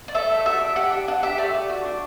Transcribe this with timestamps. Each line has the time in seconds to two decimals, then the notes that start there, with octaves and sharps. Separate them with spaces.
0.08 D5
0.15 A4 E5
0.30 A3
0.45 F#4 E5
0.61 D4
0.76 G4 F#5
0.92 D4
1.08 D4 F#5
1.23 G4 E5
1.38 A3 D5
1.54 A3
1.69 F#4
1.85 D4